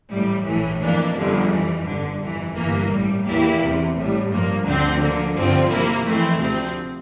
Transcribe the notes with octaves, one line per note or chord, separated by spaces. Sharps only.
A1 A2 G3
A#1 A2 E3
F2 E3 A#3 D4
G1 F2 D3 F3
F2 E3 G3
G1 G2 D3
G1 F2 E3
G1 G2 E3 A#3
A1 A2 G3
E2 E3 A#3 E4 G4
E2 C3 E3
A1 A2 G3
G2 F3 A#3
D2 D3 F3 C4
D3 F3 A#3
G1 G2 D3 F3 C4
C3 F3 A#3 E4
F2 E3 A3 C4 E4
D2 C3 F3 C4